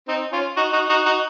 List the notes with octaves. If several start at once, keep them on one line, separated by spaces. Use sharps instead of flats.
C4 D#4
C#4 F4
D#4 F#4
D#4 F#4
D#4 F#4
D#4 F#4